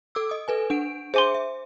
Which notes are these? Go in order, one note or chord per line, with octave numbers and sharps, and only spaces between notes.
A4 D6 E6
D#5 D#6
A4 B4 G#5
D4 F#5 D7
G#4 C5 E5 G#5 C6 D6
E5